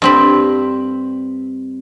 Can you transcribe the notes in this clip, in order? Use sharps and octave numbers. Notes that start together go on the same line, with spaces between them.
G2 C4 B5